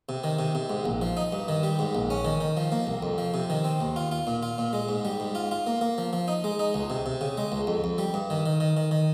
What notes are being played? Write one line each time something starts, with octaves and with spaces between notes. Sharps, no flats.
C3
D#3
C3
C3
G#2
A#1
F3
D#4
G2
D#3
G3
G#2
A#1
C#4
D#3
D#3
F3
A#3
C2
F2
F3
C3
D#3
C4
D#2
F4
F4
A#2
F4
A#2
G#3
G#2
G3
G#2
F4
F4
A#3
A#3
F3
F3
D#4
G#3
D#4
C#2
C3
C3
C#3
G#3
C#2
F2
F2
G3
G2
D#3
D#3
D#3
D#3
D#3